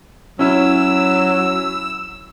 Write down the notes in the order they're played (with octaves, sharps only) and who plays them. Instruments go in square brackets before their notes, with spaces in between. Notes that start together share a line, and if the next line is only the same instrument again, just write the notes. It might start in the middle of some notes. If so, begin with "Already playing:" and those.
[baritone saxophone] F#3 [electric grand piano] C#4 E4 [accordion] E6